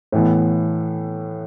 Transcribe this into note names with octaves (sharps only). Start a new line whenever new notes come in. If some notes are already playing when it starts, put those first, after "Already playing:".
A2 E3 B3